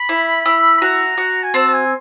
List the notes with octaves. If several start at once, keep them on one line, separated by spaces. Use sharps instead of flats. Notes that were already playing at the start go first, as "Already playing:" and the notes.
Already playing: B5
E4
E4
B5
F#4 A#5
F#4
G#5
C4 A5
A5
G#5